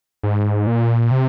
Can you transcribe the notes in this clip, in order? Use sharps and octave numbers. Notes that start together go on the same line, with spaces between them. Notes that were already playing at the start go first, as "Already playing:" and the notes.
G#2
A#2
C3